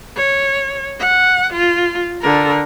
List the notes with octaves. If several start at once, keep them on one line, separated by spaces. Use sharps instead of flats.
C#5
F#5
F4
D3 A#4